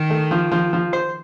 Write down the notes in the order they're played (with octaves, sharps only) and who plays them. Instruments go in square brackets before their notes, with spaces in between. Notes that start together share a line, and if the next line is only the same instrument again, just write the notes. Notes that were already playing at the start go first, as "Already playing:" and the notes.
Already playing: [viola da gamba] D#3
[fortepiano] A3
F3
F3
F3
C5